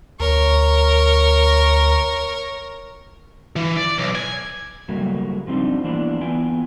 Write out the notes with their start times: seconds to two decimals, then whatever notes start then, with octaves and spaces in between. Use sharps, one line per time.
0.20 D2 A#4 C#5
3.56 E3
3.77 D5
3.98 B1
4.15 G#5
4.88 C#3 F#3 G3 A3 A#3
5.47 F3 G3 C4 D4 D#4
5.84 E3 A#3 B3 D4 E4 F4
6.21 E3 B3 F4 E5 G5 G#5